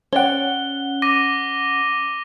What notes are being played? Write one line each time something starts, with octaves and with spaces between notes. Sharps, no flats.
C#4 C#5 D5 F#5 G5 G7
D6 A#6 D#7